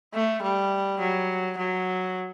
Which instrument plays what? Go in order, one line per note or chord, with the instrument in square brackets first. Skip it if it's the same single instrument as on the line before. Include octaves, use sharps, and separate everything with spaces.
[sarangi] A3
G3
F#3
F#3